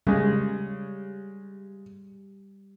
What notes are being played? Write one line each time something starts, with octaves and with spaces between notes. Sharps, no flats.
C#3 G3 G#3